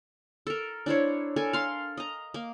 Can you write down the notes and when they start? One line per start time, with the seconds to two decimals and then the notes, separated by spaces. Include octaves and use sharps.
0.47 A4 A#4
0.86 D4 E4 C5 C#5
1.36 A4 A#4 G#5
1.53 F5 C6
1.97 D#5 A#5
2.34 A#3